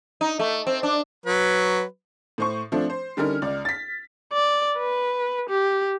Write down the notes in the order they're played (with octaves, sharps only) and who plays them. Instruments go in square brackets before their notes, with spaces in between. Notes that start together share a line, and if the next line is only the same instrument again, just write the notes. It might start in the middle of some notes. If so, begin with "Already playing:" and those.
[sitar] D#4
A3
C4
D4
[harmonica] F#3 B4
[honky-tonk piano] A2 C5 C#6
F3 A3 C4 D4
C5
D3 G3 C#4 D#4 A#4 F6
C#2 D5
A6 B6
[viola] D5
B4
G4